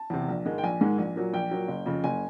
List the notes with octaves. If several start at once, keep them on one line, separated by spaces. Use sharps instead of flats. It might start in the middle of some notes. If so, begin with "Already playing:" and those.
Already playing: A5
E2 C3
A#1
G#2 D#3 G#3
G5
A#1 G#5
G#2 D#3 G#3
A#1
A#2 F#3
A#1 G5
A#2 F#3
F#1
F2 C#3
F#1 G#5